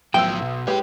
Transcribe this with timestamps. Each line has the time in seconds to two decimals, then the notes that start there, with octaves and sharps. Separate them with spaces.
0.14 B1 A2 F3 F#3 G5 E6
0.42 B2
0.67 G#3 G4 B4 C#5 G5